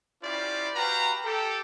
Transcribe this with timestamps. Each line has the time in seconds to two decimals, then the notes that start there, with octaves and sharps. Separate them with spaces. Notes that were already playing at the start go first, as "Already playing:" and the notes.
0.23 C#4 E4 F4 G4 C5 D5
0.75 F#4 G4 B4 F5 G5 A#5
1.24 G4 A4